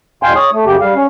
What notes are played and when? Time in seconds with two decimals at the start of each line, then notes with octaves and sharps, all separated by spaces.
0.23 E2 B2 F5 G5 G#5 C6
0.36 C#5 D#6
0.53 A3
0.66 F#2 C#3 G4
0.81 G3 F5
0.96 C#4